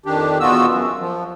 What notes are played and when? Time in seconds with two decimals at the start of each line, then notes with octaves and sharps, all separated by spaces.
0.06 F2 D#3 D4 G4
0.40 E2 B2 B3 F4 F#4 E6
0.67 F#2
0.99 F3